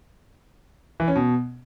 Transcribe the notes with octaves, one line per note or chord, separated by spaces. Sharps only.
E3
C#4
B2